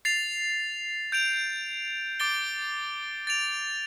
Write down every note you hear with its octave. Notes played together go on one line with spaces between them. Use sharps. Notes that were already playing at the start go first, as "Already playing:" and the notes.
A6 C7 F7
G6 D7 F7
D6 A6 D7 G7
A6 D7 F7